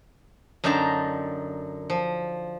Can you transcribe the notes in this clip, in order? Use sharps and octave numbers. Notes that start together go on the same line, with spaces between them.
F#2 D3 D#4 G5 A5 A#5
F3